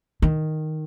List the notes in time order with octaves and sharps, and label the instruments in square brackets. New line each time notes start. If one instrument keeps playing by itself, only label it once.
[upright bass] D#3